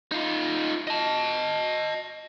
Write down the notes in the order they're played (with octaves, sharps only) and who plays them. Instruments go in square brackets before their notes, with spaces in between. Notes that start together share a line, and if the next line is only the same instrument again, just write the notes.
[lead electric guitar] D#4 F4
D#5 A5